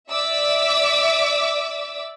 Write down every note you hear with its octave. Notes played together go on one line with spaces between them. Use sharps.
D5 E5 D6 E6